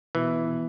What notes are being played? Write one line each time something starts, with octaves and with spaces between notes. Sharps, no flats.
B2 E3
B2